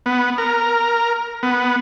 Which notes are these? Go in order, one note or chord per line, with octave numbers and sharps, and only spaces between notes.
B3
A#4
B3